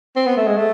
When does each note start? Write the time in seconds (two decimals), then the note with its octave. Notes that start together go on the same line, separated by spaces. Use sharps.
0.16 C4
0.26 B3
0.37 A3
0.47 G#3
0.57 A3